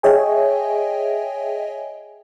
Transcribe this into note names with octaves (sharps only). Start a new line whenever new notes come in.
G#4 C#5 D#5 E5 G5 G#5